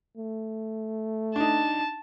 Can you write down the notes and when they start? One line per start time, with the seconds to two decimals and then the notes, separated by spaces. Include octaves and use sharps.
0.18 A3
1.36 D4 D#4 A5